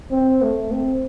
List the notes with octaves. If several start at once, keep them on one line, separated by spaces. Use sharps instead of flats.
C4
A3
C4